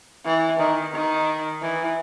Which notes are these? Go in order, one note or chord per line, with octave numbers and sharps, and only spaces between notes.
E3
D#3
D#3
E3